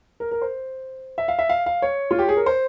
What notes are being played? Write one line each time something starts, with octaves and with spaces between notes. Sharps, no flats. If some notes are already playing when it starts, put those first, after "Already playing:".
A#4
A#4
C5
E5
F5
E5
F5
F5
C#5
F4
G4
G#4
A#4
C5